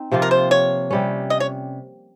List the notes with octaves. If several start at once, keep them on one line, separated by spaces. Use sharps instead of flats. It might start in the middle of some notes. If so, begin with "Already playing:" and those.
Already playing: C4 D#4
C3 F3 A#3 F4
A#4
C5
C#5
C3 G3 C#4
D#5
C#5